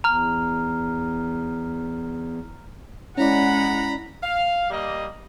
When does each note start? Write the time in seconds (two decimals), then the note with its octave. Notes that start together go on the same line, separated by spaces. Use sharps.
0.04 E2 A#5 F6
3.18 G#3 C#4 E4 D5 F#5 A#5 B5
4.23 F5
4.70 G3 A#3 D#5